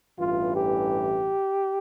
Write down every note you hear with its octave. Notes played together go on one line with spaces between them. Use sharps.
A1 G2 E3 F4
G4